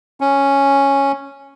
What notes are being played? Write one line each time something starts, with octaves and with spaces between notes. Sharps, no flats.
C#4